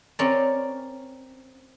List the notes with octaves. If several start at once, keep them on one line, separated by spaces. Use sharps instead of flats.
C4 C#4 A#4 D5